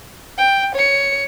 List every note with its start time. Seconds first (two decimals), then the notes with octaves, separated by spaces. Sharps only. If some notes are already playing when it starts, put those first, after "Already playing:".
0.38 G5
0.75 C#5 C#7